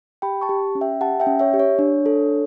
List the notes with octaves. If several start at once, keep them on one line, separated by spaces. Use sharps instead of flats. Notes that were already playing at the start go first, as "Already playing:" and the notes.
G4 G5 B5
A5 C#6
G4
C#4
E5 G5
G4 F#5 A5
E5 G5
C#4
C#5 E5
G4
C#5
D4
A4